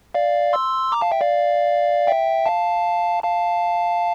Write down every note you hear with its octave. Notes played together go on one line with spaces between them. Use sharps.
D5 F5
C6 E6
A#5 D6
F5 A5
E5 G5
D5 F5
E5 G5
F5 A5
F5 A5